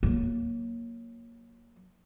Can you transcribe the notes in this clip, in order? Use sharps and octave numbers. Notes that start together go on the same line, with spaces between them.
F#3 A#3